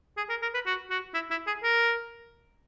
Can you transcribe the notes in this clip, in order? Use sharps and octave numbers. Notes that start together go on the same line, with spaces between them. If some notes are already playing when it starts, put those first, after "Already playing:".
G#4
A#4
A#4
B4
F#4
F#4
E4
E4
G#4
A#4